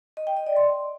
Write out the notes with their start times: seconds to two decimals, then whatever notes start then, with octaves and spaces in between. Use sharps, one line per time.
0.17 D#5
0.27 G5
0.37 D#5
0.47 D5
0.56 C6